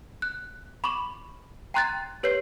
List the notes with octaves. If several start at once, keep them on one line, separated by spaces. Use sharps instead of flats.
F#6
B5 C#6 D6 E7 F#7
G5 A#5 C6 F#6 G#6 A6
G4 B4 C#5 G6 C7